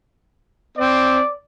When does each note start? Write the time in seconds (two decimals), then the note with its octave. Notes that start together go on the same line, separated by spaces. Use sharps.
0.78 C4 D5